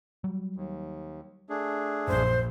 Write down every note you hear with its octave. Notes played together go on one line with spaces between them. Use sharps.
F#3 G3
D#2
A3 D4 G#4
A#1 F#2 C5